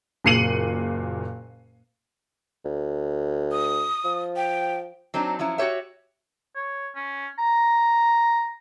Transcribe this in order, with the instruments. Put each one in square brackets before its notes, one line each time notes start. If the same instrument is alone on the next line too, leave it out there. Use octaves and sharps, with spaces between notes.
[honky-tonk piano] F#1 A#2 C7 C#7 D#7 F#7
[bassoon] D2
[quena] D#6
[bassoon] F3
[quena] G5
[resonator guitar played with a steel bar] F#3 C4 D4 D#4
F3 F#3 C#4 E4
F#4 G4 C#5 E5
[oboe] C#5
C#4
A#5